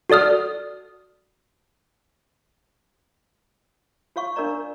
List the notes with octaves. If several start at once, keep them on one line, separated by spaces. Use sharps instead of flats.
F#4 A4 D5 D#6 F6
F4 C#5 F5 C#6
D4 A#4 C#5 D5 A#5